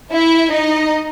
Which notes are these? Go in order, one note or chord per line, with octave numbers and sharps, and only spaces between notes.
E4 E5
D#4 D#5